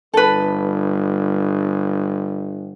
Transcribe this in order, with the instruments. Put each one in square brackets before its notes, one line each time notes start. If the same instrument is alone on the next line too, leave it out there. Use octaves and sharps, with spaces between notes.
[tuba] G1 [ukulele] A4 B4